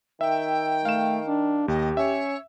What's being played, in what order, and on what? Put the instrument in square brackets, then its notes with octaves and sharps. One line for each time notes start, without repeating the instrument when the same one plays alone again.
[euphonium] D#3 [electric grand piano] E5 [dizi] G5
[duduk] A3 [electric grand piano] F5 E7
[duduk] D4
[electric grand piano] D#2 [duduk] G4 [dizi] D#5
[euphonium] C#4 [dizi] C#5 [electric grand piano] E5